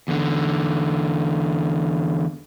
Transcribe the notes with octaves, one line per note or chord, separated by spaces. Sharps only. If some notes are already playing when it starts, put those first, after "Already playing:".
E2 D3